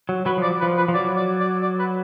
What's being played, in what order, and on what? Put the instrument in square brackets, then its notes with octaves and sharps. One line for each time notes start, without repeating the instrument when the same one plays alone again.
[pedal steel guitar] F#3
[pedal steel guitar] F#3 [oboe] B4
[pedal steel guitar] F3
[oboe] D5
[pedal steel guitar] F3 [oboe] B4
[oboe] B4
[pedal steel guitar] F3
[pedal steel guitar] F#3 [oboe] D5
[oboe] D5
D5
D5
B4